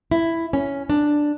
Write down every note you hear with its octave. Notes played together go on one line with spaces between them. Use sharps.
E4
C#4
D4